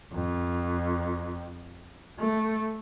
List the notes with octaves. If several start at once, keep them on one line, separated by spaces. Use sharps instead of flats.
F2
A3